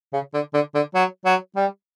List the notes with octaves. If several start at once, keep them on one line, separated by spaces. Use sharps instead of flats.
C#3
D3
D3
D3
F#3
F#3
G3